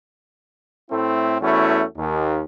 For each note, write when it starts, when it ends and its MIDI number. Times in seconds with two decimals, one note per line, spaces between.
0.91 1.37 45
0.91 1.37 57
0.91 1.37 60
0.91 1.37 64
1.41 1.84 40
1.41 1.84 57
1.41 1.84 61
1.41 1.84 64
1.41 1.84 66
1.98 2.43 39